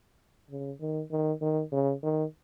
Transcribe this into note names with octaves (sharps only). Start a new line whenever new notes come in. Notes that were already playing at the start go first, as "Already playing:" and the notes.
C#3
D#3
D#3
D#3
C#3
D#3